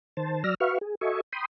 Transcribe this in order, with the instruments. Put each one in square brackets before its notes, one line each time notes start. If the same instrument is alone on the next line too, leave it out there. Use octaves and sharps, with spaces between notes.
[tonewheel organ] D#3 C5 A5
F#3 D5 E6 F6 A#6
F#4 B4 E5 F5 C#6 F6
G#4
F#4 A4 D#5 E5 G#5 C#6
G5 B5 C6 D#6